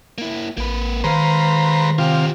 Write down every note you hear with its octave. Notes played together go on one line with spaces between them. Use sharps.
A#3 E4
A1 A#3 B4
D#3 G#3 B4 C5 F5 A#5
C3 F4 G4 F5